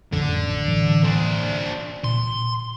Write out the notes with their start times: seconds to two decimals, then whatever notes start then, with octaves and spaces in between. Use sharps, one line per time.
0.12 A1 F2 D3
0.68 A2 E3 F#3
1.04 D4 C5
2.04 A#2 C6